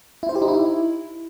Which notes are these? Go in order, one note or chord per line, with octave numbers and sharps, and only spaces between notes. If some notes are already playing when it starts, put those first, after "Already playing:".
E4
C5
G4
D#4
E4